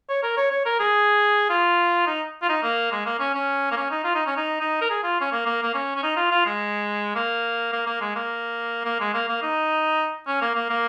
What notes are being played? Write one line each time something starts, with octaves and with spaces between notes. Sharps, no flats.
C#5
A#4
C#5
C#5
A#4
G#4
F4
D#4
F4
D#4
A#3
G#3
A#3
C#4
C#4
A#3
C#4
D#4
F4
D#4
C#4
D#4
D#4
A#4
G#4
F4
C#4
A#3
A#3
A#3
C#4
C#4
D#4
F4
F4
G#3
A#3
A#3
A#3
G#3
A#3
A#3
G#3
A#3
A#3
D#4
C#4
A#3
A#3
A#3